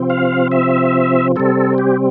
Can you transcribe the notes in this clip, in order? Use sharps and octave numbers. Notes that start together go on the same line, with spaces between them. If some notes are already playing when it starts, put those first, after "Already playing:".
Already playing: C3 F3 C4
F5
E5
C3 G3 C4 A4
G4